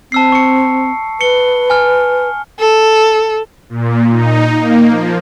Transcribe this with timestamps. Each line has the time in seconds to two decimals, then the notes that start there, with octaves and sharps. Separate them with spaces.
0.12 C4 A5 E6 C7
0.32 C#6 C#7
1.21 B4 C#7 G7
1.70 G#5 F6
2.60 A4
3.69 A#2
4.10 D#4
4.56 A#3
4.89 F3